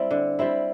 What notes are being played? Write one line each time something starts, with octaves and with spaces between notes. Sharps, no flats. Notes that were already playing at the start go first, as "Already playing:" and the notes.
Already playing: G3 C4 E4
D3
G3 C4 E4